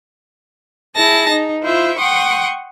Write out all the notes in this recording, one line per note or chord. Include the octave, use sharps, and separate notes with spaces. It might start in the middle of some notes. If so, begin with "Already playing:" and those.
E4 G#4 A5 A#6
D#4
E4 F4 C5 E5
F#5 G5 C6 C#6 D#6